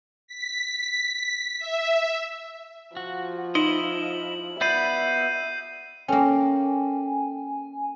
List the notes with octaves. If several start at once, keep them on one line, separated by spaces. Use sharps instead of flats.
B6
E5
F3 F#4
D#4 E4 D#5 F#7
B3 D5 E5 B5 G6 C7 D#7
A#3 C#4 A4 G5 G#5